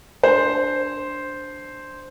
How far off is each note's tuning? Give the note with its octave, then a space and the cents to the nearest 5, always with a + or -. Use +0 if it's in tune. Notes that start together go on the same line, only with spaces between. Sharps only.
D4 -5 C5 +0